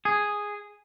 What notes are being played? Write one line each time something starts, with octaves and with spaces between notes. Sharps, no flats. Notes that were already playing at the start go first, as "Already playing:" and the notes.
G#4